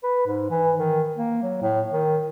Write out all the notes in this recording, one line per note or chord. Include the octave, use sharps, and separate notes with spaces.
B4
G#2
E3
D#3
A#3
F#3
A2
D#3